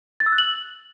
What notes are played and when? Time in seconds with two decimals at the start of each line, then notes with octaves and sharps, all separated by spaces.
0.20 A6
0.26 E6
0.32 F#6
0.38 F#7